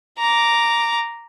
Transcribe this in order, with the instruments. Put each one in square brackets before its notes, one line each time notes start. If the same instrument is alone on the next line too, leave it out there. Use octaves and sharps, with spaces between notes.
[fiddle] A#5 D6